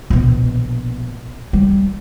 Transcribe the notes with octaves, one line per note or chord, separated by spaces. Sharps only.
A#1 B2
G3